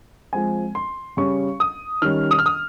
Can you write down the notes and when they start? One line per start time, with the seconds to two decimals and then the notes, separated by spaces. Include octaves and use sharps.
0.33 F3 G#3 C4 G#5
0.75 C6
1.17 C#3 G3 C#4 C#6
1.60 D#6
2.02 D#3 G3 C#4 F6
2.31 D#6
2.39 F6
2.46 D#6